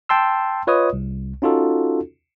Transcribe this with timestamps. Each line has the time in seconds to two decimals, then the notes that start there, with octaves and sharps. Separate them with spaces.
0.09 G5 A5 C6 E6
0.67 F4 B4 C#5 D#5 D#6
0.93 C2
1.42 C#4 D#4 F4 F#4 A4